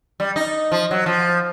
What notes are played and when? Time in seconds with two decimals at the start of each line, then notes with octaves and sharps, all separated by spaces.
0.20 G3
0.36 D#4
0.72 F3
0.91 F#3
1.06 F3